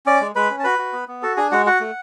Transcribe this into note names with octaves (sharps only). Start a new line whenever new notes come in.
C#4 D5 D6
G#3
G#3 B4 B5
C#4
A5
F#4 B4 B5
F#4
B3
B3
F#4 A4 A5
D4 G#4 G#5
G#3 F#4 F#5
F#4 F#5
A3